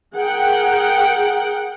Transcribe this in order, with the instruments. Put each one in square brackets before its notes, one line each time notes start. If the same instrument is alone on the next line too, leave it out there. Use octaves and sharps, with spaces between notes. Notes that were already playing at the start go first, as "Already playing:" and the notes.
[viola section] G#4 A#4 F#5 G5